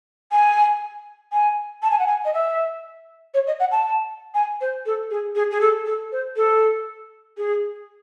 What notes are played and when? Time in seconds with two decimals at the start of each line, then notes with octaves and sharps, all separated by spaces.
0.31 G#5
1.32 G#5
1.82 A5
1.90 G#5
1.99 F#5
2.06 G#5
2.24 D#5
2.33 E5
3.34 C#5
3.46 D#5
3.59 F#5
3.71 A5
4.34 G#5
4.60 C5
4.85 A4
5.10 G#4
5.35 G#4
5.50 G#4
5.60 A4
5.85 A4
6.11 C5
6.36 A4
7.37 G#4